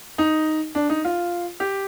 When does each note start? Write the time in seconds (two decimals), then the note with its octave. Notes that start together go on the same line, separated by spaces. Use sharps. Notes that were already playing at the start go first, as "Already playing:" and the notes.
0.18 D#4
0.75 D4
0.89 D#4
1.04 F4
1.60 G4